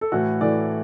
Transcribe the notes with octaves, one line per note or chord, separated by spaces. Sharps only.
A4
A2 E3 A3 F#4
A2 E3 A3 D5